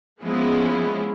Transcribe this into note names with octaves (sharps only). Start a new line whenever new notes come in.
F3 G#3 A#3 B3 C#4 E4